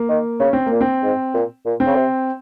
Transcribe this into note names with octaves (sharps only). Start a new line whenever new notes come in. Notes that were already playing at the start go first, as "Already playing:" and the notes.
Already playing: A#3
D#3
C#3 C#4
C4
A#2 A#3
C4
G#2
A#2
A#2
C4
C#3
C3